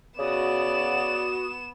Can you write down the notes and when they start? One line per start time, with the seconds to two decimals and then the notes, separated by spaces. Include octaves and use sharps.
0.19 C#3 B3 F#4 D5 D#6 E7